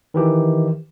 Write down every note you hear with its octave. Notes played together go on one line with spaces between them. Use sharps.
D#3 E3 G4